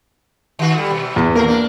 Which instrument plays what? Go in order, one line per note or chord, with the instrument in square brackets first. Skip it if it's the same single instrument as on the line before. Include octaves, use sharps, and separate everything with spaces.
[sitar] D#3 F#4
G3 A3
B2
[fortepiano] E2
[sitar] D#2 A3 A#4 [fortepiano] A#3
[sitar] D4